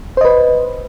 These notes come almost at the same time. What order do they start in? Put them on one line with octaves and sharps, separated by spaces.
C5 D#5 B4